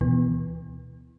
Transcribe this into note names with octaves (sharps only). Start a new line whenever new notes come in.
D2 B2 E3 B3